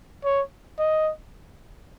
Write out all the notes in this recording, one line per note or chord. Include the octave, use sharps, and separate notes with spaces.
C#5
D#5